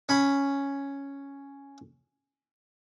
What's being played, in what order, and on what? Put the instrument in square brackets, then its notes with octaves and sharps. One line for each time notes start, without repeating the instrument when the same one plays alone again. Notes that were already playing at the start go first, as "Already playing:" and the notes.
[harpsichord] C#4 B5